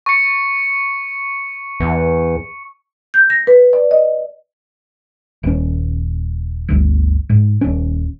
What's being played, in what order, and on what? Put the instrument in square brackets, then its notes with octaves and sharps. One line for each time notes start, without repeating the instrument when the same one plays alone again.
[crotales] C#6 C#7
[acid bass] E2
[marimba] G6
A#6
B4
D5
D#5
[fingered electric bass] D#1 C#4
G1 D2
G#2
D#1 C#4